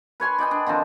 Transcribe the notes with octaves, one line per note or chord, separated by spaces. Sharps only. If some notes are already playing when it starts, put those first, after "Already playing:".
B4 C#5 G#5 C6
D5 D#5 G5 G#5
D4
D3 D#3 F3 C4